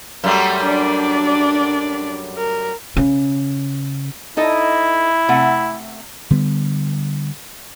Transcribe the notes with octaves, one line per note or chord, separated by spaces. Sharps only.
F#2 G3 A3
D4 D5
A#4
C#3
D#4 E4 A4 D#5
C3 A3 F#5
D3 G3 B3